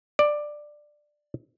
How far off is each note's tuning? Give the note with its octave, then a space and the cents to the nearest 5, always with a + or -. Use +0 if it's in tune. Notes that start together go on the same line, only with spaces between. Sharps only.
D5 +10